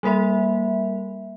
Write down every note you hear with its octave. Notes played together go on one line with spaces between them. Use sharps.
G3 A#3 A#4 E5